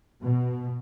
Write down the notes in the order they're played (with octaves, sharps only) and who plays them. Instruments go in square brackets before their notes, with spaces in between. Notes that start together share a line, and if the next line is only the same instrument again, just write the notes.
[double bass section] B2